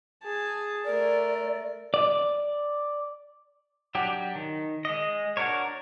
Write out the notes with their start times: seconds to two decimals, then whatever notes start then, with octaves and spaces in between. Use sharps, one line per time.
0.23 G#4 A5
0.85 A3 A#4 D5
1.94 D5
3.95 F#3 D4 G4
4.35 D#3
4.85 G#3 D#5
5.37 D4 F#4 A#4 C#5